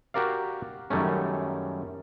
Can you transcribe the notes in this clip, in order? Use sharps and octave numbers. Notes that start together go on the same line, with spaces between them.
F#4 G4 A#4 D5 F5
F#2 D#3 G3 A3 C#4